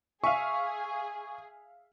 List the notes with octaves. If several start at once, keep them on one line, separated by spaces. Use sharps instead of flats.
G#4 E5 F5 G#5 C#6